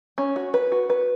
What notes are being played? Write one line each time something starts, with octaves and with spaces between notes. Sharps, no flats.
C#4
F#4
B4
F#4
B4